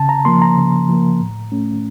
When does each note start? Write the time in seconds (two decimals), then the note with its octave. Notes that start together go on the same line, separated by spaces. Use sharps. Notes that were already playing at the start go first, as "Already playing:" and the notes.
Already playing: C#3 A5
0.09 A#5
0.25 F3 A#3 C6
0.42 A#5
0.57 C#3
0.89 F3 A#3
1.21 A2
1.52 A3 C#4